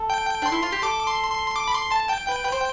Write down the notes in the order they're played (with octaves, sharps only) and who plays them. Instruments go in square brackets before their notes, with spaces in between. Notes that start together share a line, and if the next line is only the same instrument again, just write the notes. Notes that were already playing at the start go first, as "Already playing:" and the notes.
Already playing: [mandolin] A4
[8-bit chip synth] G5
[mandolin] D4 [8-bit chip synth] C6
[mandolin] E4
F4
G4
[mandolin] A4 [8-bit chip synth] D6
[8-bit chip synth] C6
C6
D6
B5
C6
A5
G5
[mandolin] B4 [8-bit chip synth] G5
[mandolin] B4
C5